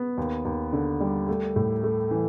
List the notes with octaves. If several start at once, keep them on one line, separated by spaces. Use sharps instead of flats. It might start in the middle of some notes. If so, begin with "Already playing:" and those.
Already playing: B3
D#2
D#2
D3
G3
A3
A2
A3
E3